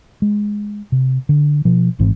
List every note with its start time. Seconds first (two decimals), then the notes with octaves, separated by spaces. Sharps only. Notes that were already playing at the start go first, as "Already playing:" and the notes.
0.22 G#3
0.92 C3
1.29 D3
1.65 B2 F3
1.99 G#1 G#2 E3 C4